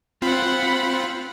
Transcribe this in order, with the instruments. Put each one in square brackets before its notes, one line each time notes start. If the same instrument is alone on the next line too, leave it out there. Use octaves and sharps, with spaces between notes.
[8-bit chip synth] C4 F4 [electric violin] F#5 B5